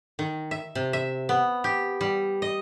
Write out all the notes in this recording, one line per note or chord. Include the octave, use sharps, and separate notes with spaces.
D#3
E5
C3
E5
B3
G4
G3
D#5